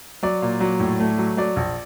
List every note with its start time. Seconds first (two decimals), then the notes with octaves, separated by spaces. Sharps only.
0.23 F#3 D5
0.42 A#2
0.60 F#3
0.80 A2
1.00 A3
1.18 F#3
1.37 F#3 D5
1.57 A#1